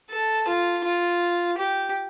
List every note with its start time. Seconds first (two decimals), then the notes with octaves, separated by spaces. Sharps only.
0.10 A4
0.48 F4
0.84 F4
1.58 G4